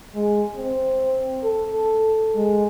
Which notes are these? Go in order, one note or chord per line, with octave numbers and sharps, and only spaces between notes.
G#3
C4
A4
G#3